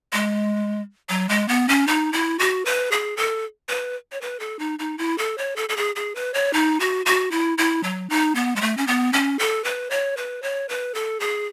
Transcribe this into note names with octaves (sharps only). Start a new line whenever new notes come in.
G#3
F#3
G#3
B3
C#4
D#4
E4
F#4
B4
G#4
A4
B4
C#5
B4
A4
D#4
D#4
E4
A4
C#5
A4
A4
G#4
G#4
B4
C#5
D#4
F#4
F#4
E4
E4
F#3
D#4
B3
G#3
A3
C#4
B3
C#4
A4
B4
C#5
B4
C#5
B4
A4
G#4